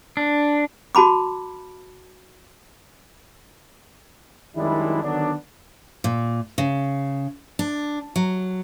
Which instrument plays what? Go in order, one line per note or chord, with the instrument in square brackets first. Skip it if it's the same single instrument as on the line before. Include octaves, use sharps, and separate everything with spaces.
[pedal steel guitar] D4
[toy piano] F#4 A5 B5 D6
[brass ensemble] F#2 D#3 G3 G#3 D4 E4
D3 D#3 F#3 B3 D4
[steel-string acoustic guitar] A#2
C#3
D4
F#3